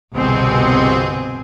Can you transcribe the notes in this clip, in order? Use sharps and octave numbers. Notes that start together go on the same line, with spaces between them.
G1 C2 B2 C4 G#4